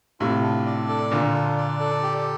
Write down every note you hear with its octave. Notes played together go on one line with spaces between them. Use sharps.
A2 C3 F4
D4
D5
A4
A#2 D3 F4
D4
D5
A4
G4